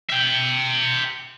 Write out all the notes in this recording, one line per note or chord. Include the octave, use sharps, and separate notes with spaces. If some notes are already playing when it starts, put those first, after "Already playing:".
E5 G5